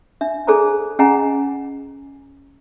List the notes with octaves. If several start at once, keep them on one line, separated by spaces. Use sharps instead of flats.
D4 E5
D4 G#4 A4 C5 D5 A#5
C#4 G#4 D#5 F#5 G#5 A#5